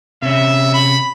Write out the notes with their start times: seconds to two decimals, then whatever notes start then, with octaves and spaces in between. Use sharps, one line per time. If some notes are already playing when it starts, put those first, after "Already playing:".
0.22 C3 C#4 E5
0.74 B5